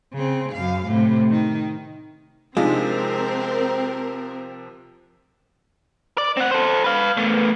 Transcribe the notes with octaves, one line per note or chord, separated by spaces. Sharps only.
C#3 C4
F#2 F5
A2 C3
D#3
C3 F3 G#3 C4 D4 D#4 F4 A#4
D5
C4 F#5
A4 C5
B4 F5
A3 B3